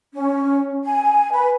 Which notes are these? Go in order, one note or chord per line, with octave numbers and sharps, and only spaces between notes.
C#4
G#5
B4